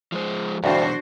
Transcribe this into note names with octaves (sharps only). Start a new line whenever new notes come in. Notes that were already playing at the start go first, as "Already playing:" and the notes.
F3 G#3 C5
D2 G2 B2 E3 F#3 D4 F#4 C5